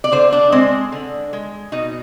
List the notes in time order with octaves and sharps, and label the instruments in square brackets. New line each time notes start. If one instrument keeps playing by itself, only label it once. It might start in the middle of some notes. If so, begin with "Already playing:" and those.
[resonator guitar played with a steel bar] D5
D3 C5
D4
G#3 C4
D3
G#3
B2 D#4